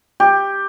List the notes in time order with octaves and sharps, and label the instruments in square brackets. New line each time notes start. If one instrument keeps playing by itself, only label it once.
[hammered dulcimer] G4